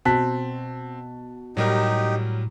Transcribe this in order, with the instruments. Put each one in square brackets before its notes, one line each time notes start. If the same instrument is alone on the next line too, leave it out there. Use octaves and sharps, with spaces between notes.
[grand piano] B2 A5 B6 [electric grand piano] C4 F#6
[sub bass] A2 [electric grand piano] F#3 G3 A#4 [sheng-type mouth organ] D#4 G4